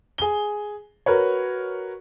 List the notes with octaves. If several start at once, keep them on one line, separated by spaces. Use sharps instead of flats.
G#4 G7
F#4 A#4 B4 C#5